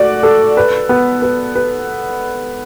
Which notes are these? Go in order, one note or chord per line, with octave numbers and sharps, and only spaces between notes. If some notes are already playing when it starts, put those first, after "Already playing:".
Already playing: A3 F#4 D5
A4
B4
B3
B4
B4